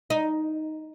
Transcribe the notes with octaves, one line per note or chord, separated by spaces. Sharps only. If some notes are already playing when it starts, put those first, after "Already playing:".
D#4